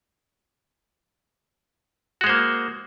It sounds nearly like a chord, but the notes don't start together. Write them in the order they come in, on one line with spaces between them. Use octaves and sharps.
F#4 G#3 C5 A#3